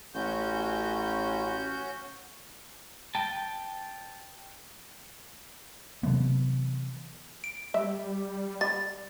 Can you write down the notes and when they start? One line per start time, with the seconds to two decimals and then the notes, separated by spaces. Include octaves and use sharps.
0.15 A1 C#4 F#4 G6
3.15 G5 A5
6.03 C3 E3 F#3 B3
7.44 D7
7.74 G3 E5
8.61 G3 A6